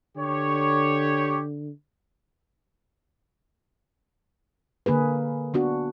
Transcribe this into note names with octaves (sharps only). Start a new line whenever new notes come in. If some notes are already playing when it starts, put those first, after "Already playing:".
D3 G4 C#5
D3 A#3 G#4 B4
B3 D4 F#4